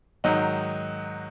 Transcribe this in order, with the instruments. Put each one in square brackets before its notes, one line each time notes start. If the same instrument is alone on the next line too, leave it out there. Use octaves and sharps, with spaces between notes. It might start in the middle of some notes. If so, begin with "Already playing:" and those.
[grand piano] G#2 D#3 F#3 D#4